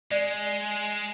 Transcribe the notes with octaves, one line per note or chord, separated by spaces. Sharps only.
G#3 D5